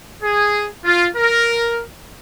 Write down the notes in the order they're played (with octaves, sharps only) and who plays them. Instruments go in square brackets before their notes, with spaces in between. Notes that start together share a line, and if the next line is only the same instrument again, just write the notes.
[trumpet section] G#4
F4
A#4